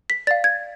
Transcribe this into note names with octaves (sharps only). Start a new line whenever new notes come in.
B6
D5 F5 A6
G#6